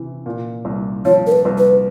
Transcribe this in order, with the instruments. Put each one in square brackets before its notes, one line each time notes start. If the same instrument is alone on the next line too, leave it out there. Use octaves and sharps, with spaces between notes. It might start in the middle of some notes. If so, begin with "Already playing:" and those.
Already playing: [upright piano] C3 E3
A#2
C2
[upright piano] F3 [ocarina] C#5
[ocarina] A#4
B4
[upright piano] C2
[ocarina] B4